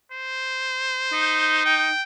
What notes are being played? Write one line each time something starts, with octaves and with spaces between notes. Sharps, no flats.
C5
D#4
G5